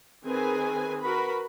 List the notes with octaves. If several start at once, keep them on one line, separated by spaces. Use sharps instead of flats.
D#3 C4 G#4 B4 G#5
F#4 A#4 B4 B5